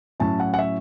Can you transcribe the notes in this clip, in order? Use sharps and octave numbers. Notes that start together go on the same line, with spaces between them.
A2 F#3 C#4 E4 A5
F#5
F#5
E5